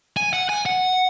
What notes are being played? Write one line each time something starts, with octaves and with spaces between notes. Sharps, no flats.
G#5
F#5
G#5
F#5